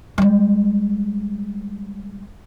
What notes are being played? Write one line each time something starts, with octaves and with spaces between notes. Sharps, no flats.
G3 G#3